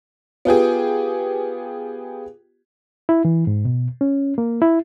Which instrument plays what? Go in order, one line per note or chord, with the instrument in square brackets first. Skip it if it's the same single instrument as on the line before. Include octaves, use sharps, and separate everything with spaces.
[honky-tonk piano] B3 F4 G4 G#4
[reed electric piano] E4
E3
G#2
B2
C#4
A#3
E4